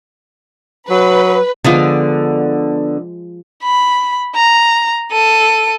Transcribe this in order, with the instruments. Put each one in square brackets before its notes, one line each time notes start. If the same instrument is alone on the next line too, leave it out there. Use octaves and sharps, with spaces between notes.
[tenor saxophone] F#3 [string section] B4
[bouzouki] D3 B3 D5 [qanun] F3 G#3
[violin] B5
A#5
A4 D#7